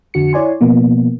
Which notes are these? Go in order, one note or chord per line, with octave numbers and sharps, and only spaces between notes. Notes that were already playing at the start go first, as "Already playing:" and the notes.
F2 D3 F#4 C#7
E4 C#5 D5 G#5 C6
B2 F3 A#3 B3